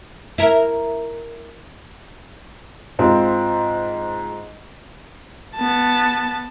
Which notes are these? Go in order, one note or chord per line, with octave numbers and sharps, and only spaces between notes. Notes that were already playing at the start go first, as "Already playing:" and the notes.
E4 A#4
G#2 C4 F4
B3 A5